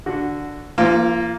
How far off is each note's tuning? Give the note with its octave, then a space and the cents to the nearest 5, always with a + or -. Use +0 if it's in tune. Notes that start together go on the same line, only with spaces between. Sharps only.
D3 +0 F#4 +0
F3 -40 A#3 +0 F4 +0